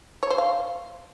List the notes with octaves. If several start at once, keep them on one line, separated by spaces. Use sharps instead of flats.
C#5
C5
F5